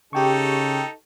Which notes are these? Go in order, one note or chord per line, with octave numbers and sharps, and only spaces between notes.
C#3 D#4 G4 A4 G5 C#6